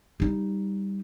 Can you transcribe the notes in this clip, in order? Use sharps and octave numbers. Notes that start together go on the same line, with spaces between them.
G3 D#4